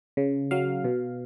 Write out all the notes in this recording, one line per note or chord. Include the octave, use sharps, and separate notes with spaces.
C#3
F#3 F5
B2